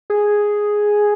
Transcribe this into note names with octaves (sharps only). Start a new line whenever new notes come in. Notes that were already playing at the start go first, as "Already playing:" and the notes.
G#4